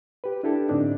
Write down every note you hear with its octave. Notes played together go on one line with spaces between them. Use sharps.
G4 B4
D4 E4 G4 A4
A2 D3 C4 D4 D#4